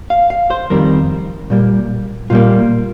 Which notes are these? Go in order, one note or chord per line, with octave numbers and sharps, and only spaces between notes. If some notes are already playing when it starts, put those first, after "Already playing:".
F5
F5
C5
F2 D#3 G3 C4 A#4
A#2 G3 A#3
A#2 G3 A#3 F4